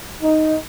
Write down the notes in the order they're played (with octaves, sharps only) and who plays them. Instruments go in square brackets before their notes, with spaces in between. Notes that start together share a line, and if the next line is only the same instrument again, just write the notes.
[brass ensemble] D#4